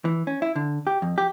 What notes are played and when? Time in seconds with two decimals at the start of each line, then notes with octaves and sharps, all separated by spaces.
0.05 E3
0.27 C#4
0.42 E4
0.56 D3
0.87 G4
1.02 F2
1.18 G4